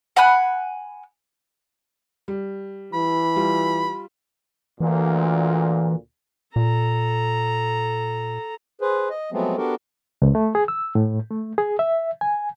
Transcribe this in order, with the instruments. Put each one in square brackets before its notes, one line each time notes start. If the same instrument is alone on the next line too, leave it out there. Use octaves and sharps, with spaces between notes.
[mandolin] F#5 G#5 B5 F#6
[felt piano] G3
[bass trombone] E3 [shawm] B5
[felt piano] G3 F4
[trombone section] D2 A#2 [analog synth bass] E3
[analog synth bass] A#2 [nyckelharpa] A4 A#5
[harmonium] G#4 B4 C5
D#5
F3 F#3 G#3 A3 B3 C4
B3 D4 F#4 G4 A4 A#4
[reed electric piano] C#2
A3
G#4
E6
A2
A3
G#4
E5
G#5